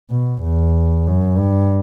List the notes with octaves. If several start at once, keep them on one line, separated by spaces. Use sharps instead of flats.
B2
E2
F#2
G2